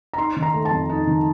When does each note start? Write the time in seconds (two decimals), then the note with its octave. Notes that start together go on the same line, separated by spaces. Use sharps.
0.13 A#5
0.18 D#4 C6
0.37 D#3
0.43 A#5
0.54 A3
0.65 A5
0.71 F2
0.89 D#4
1.07 D#3